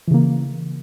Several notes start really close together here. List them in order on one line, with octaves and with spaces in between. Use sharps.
E3 C#3 A#3